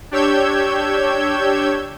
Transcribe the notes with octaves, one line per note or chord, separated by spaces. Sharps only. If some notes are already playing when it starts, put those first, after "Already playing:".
D4 G4 C#5 E6 G6 G#6